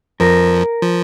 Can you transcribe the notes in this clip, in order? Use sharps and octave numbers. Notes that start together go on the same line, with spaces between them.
F2 F3 A#4
F3